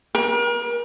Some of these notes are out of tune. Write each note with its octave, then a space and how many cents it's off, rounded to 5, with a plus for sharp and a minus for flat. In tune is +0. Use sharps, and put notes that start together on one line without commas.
A#4 +40